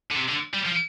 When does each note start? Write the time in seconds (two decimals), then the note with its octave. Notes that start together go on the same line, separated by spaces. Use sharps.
0.12 D3
0.17 C3
0.29 D3
0.54 G3
0.66 F3